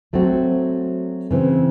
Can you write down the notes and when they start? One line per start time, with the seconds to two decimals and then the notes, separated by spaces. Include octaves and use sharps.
0.13 F#3 A3 C4 F#4
1.31 C#3 E3 C4